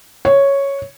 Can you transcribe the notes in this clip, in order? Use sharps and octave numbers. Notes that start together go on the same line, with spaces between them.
C#5